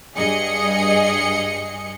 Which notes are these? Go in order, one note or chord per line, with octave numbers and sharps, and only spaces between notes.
G2 G#4 D#5 C#7